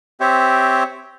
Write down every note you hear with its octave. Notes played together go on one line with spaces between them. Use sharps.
C4 G4 C5 C#5 E5